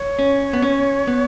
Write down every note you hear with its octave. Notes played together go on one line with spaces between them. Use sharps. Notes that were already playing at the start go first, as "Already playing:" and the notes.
Already playing: C#5
C#4
B3
C#4
B3